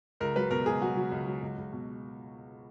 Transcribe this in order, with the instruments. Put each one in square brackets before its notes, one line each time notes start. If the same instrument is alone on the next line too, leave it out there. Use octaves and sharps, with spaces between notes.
[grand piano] C#2 A#4
F#3 B4
B2 A#4
C#2 G#4
F#3 F#4
F#3
C#2
F#3
C#2
C#2
B2